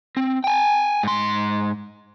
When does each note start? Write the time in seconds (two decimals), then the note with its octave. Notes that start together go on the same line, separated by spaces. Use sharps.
0.17 C4
0.44 G5 G#5
1.03 G#2 C6